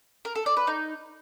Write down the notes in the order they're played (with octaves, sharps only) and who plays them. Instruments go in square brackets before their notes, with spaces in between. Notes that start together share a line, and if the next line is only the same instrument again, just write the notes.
[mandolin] A#4
A4
D5
B4
D#4